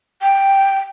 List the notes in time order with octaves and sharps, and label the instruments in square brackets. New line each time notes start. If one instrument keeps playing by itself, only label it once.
[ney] G5